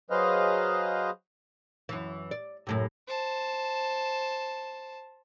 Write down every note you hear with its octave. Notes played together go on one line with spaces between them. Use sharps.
F#3 G#4 B4 C5 D#5 F5
F#2 E3
D5
F#2 A2 C3
C5 A5